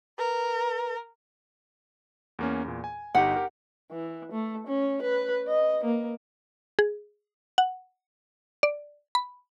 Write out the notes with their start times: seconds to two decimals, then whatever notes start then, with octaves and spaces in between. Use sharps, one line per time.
0.18 A#4 B4
2.39 E2 A#3 C#4
2.64 E2 A#2
2.84 G#5
3.15 G1 D#4 G4 F#5
3.36 G4 A#4
3.92 E3
4.32 A3
4.67 C#4
5.02 B4
5.48 D#5
5.84 A#3
6.79 G#4
7.58 F#5
8.63 D5
9.15 B5